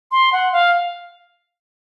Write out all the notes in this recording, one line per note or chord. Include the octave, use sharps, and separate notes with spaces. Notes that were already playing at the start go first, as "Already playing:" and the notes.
C6
F#5
F5